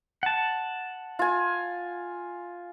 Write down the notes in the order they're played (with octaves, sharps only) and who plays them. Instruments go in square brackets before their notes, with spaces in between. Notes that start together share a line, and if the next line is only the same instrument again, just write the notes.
[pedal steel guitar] F#5 A5
[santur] F4 G#5